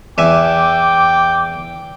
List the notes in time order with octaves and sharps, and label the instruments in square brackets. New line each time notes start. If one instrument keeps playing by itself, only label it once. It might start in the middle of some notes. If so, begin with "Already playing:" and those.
[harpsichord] E2 E5 G#5 [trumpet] G5 [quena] D6